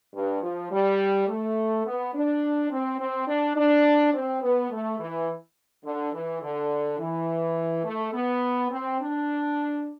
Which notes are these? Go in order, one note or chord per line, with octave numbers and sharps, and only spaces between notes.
G2
F3
G3
A3
B3
D4
C4
C4
D4
D4
C4
B3
A3
E3
D3
E3
D3
E3
A3
B3
C4
D4